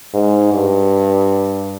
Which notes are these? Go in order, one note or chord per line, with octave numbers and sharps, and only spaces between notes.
G#2
G2